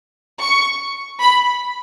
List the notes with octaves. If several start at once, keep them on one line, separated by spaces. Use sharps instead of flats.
C#6
B5